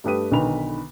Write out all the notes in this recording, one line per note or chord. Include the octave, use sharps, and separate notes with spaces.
G2 A3 G4 B4 D#6 D#7
B1 D3 D#3 B4 B5 F7